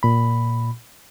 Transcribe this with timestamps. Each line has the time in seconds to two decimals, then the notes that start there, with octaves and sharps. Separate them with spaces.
0.03 A#2 B5